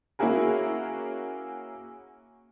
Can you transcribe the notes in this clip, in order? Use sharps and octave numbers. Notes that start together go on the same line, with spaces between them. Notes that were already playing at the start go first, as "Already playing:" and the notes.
A#3 C#4 E4 F#4 G#4 A#4